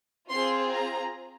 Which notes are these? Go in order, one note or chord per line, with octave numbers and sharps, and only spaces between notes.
C4 F4 G#4 C6
A#5